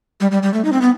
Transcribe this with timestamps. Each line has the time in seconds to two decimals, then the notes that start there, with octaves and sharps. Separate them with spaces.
0.21 G3
0.31 G3
0.43 G3
0.54 A3
0.65 D#4
0.72 C4
0.82 B3